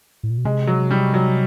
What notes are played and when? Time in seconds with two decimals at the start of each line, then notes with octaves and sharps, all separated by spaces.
0.23 A2
0.30 A#2
0.38 B2
0.45 C3 G#3
0.67 F#3
0.91 G3
1.14 F#3